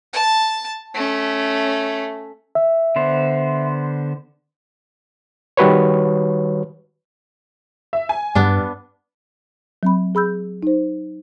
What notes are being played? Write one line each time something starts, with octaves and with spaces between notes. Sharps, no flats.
A5
A3 C#4
E5
D3 B3 C5
D#3 G3 F#4 B4 C#5
E5
G#5
G2 G3 B3 D4
F#3 C4 B5
G#4 B5 E6 G6
D#4 C5